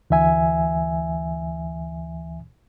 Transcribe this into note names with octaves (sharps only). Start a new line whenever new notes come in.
D2 E3 E5 G#5